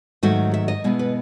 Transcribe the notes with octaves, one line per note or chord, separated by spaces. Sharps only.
G#2 D#3 F#3 A3 F#4
E5
D#5
B2 G#3 B3 E4
B4